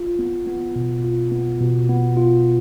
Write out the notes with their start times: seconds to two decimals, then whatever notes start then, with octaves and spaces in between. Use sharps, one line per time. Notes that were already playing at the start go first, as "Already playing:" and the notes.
Already playing: F4
0.19 B3
0.47 B3
0.76 B2
1.04 F4
1.32 B3
1.60 B2
1.89 B3
2.17 F4